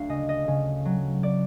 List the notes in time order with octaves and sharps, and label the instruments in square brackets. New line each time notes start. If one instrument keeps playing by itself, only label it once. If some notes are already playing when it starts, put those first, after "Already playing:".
Already playing: [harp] D2 F5 G5
C#3 D#5
D#5
C#3
F#3
D5